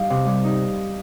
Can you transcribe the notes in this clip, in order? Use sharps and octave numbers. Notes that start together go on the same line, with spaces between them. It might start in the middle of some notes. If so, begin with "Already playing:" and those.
Already playing: G3 D#4 F5
C3
G3
D#4